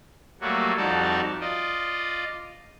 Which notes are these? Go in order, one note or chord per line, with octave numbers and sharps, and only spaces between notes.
F#3 G3 A3 A#3 F#4
F2 G3 D#4 F#4 D5 A5
F4 D5 D#5